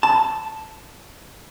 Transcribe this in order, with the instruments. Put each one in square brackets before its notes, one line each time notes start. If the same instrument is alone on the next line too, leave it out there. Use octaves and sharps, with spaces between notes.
[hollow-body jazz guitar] A5